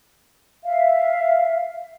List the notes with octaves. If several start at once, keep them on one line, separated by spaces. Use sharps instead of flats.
E5 F5